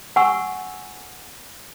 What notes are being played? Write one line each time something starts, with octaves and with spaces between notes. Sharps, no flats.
F#5 G#5 C#6 E6